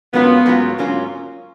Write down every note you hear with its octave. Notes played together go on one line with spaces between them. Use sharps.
G#2 F#3 A#3 B3 C#4 F4
G#2 F#3 A#3 C#4 F4
G#2 F#3 A#3 C#4 F4